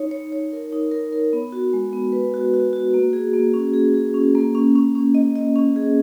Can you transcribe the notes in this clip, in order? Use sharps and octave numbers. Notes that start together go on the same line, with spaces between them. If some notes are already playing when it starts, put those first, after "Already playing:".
Already playing: D#4 C#5
C#5
C#5
A#4
D#4
A#4
A#4
B3
F#4
G#3
B3
B4
F#4
F#4
F#4
A#3
G#4
A#3
C#4
G#4
G#4
C#4
A#3
C#4
C#4
C#4
D#5
D#5
C#4
G#4